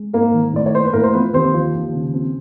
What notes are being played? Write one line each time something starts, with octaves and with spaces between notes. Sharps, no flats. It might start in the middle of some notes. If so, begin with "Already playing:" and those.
Already playing: G#3
G#2 A#3 A#4
D#3
A2 D5
C#5
A#3 C5
B4
A2 A#3 A#4
C5
F3 B3 B4
D#2 C4 C5
F3
D#2
C#3
C4